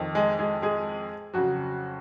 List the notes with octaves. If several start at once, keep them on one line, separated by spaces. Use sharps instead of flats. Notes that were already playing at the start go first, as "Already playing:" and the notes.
Already playing: F2 D#3
G#3 G#4
G#3 G#4
G#3 G#4
F2 C#3 F#3 F#4